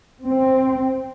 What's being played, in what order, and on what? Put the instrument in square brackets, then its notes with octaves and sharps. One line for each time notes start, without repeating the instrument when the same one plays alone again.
[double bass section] C4